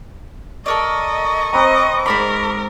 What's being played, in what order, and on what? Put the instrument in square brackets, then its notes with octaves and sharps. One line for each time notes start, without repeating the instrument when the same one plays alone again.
[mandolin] A4 A#4 D5 [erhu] D#5 [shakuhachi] C#6
[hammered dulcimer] C4 B4 A#5 [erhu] D#5
[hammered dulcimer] G#2 D6 [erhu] A#4 [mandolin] C5 D5 B5